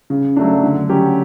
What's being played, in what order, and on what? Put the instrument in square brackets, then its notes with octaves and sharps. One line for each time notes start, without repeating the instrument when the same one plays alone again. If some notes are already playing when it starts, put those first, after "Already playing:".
[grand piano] C#3
F#3 A3 D4
D3
F#3 C#4 G4